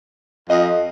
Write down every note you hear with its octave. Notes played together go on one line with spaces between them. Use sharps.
F2 D#5